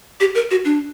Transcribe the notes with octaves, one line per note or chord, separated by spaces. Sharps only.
G4
A#4
F#4
D4